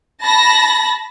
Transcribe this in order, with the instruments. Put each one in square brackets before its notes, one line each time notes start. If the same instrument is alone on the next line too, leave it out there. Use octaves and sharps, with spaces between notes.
[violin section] A5 B5 A#6